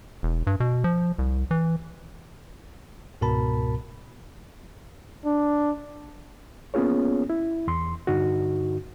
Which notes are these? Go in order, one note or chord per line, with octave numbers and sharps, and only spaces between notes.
E1
G2
B2
F3
C2
E3
C#2 G#2 B2 A#4 A5 B5
D4
A#3 B3 C#4 F4 G#4 C#5
E4
E2 C6
G2 D3 D#4 F#4